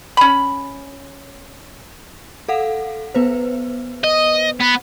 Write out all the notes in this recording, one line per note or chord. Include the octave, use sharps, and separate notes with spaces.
C#4 B5
A4 F5 F#5
B3 B4 C5
D#5
B3